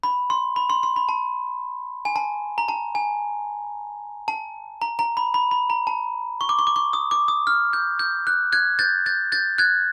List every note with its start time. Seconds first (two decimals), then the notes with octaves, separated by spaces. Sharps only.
0.03 B5
0.30 C6
0.56 B5
0.70 C6
0.83 C6
0.96 B5
1.09 A5
2.05 G#5
2.16 A5
2.58 A#5
2.68 A5
2.95 G#5
4.28 A5
4.82 A#5
4.99 A#5
5.17 B5
5.34 B5
5.51 B5
5.70 A#5
5.87 A5
6.41 C#6
6.49 D6
6.59 C#6
6.67 D6
6.76 C#6
6.93 D#6
7.11 D6
7.28 D#6
7.47 F6
7.73 G6
7.99 G6
8.27 F#6
8.52 F#6 G#6
8.79 G6 A6
9.06 G6 A6
9.32 G6 A6
9.58 F#6 G#6